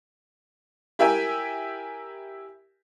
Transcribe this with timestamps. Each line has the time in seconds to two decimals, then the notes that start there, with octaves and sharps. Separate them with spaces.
0.99 E4 G4 A#4 E5 G5 G#5